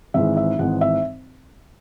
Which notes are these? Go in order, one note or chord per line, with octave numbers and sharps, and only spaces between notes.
G#1 G#2 E3 G#3 E5
E5
G#1 G#2 E3 G#3 F#5
E5